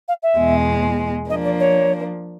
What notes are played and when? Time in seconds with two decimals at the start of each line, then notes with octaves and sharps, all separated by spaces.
0.08 F5
0.23 E5
0.38 E2 B2 G#3
1.29 F3 A#3 D4 D#5
1.44 D5
1.60 C#5